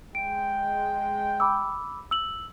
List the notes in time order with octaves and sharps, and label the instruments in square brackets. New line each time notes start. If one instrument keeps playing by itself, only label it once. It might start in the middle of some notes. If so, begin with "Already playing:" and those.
[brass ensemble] G#3 G5 [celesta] D7
[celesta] B5 D6 E6
E6 F#7